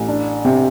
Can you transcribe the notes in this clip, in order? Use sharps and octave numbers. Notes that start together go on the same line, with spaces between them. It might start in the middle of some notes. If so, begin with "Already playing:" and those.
Already playing: A1
D4
C3